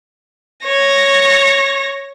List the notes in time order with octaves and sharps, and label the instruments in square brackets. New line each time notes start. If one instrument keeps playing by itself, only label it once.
[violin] C#5 A#6